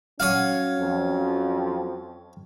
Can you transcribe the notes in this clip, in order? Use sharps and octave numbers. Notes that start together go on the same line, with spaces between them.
F#3 C#4 F#4 C#5 F5 G#5
F2